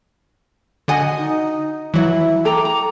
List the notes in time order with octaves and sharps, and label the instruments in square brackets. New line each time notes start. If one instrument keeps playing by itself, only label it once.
[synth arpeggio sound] D3 D#5 [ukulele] F#4 F#5 G#5
[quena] D#4
[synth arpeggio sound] E3 F#3 [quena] E4
[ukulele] A4 G5 A#5 [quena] D6
[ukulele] A#5